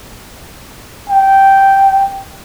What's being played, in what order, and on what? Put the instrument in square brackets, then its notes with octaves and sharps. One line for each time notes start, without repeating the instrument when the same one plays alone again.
[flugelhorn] G5